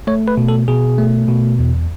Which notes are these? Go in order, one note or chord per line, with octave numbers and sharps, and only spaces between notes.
A3 C#5
B4
B2
A4
B2 G#4
A3
B2
E2